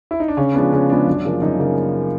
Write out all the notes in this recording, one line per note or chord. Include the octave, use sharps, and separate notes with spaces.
E4
D#4
D4
C#3 C#4
F3 G#3 B3 D4
C#3 C#4
F3 G#3 B3 D4
F#2
C#3 F3 A#3
F#2 D#4
C#3 F3 A#3